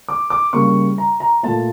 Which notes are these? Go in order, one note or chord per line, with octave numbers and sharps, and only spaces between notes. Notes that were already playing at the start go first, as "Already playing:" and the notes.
D6
D6
C#3 G3 A#3 C#6
A#5
A#5
A#2 A3 A5